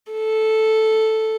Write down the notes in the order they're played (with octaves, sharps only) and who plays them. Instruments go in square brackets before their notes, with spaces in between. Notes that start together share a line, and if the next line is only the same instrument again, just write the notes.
[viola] A4